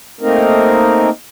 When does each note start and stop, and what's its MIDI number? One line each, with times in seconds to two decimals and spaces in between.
0.21 1.10 57
0.21 1.10 58
0.21 1.10 60
0.21 1.10 63
0.21 1.10 70